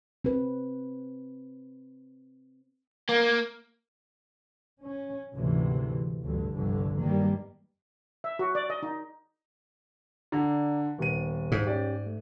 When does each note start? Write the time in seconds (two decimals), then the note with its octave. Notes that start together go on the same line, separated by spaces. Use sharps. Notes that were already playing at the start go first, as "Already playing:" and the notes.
0.25 C4 B4
3.09 A#3
4.81 C#4
5.34 D2 G#2 C3 E3
6.22 A1 D2 G2 D3
6.53 G1 C2 F2 D3
6.99 G2 D#3 G3 A#3
8.24 E5
8.39 F#4
8.55 D5
8.70 D#5
8.83 D#4
10.32 D3 D5 A#5
10.98 D#1 D#3 B3 D#7
11.52 G#2
11.67 C#4 G4 D5
12.06 A3